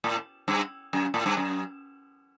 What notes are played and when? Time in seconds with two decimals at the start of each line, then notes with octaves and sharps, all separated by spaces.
0.04 A2
0.48 G2
0.93 F#2
1.14 A2
1.26 G2
1.37 F#2